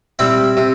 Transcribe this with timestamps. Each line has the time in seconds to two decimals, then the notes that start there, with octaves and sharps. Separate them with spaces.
0.19 G3 C4 E4
0.57 C3